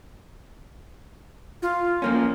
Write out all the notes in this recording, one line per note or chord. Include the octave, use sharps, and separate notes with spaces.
F4
F3 A#3 C#4